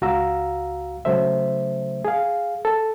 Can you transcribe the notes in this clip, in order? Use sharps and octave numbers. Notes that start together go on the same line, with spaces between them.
C#2 F#4 F5 A#5 E6
C#3 F#3 A3 C5 E5
G#4 F5
A4